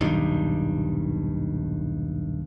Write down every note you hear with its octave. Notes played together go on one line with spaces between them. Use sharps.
D#1 B1 G2 D#3